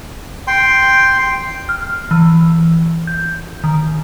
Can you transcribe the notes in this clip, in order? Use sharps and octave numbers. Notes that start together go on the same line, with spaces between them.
G5 C6
F6
E3
G6
D#3